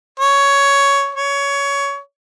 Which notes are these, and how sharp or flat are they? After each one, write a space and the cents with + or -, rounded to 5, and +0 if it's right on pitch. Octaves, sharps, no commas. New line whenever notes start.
C#5 +10
C#5 +20